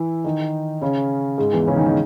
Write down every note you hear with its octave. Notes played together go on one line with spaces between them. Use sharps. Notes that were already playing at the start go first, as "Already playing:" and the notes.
Already playing: E3 E4
D#3 D#4
C#3 C#4
G#2 G#3
E2 E3
C#3 C#4
D#3 D#4
D#3 D#4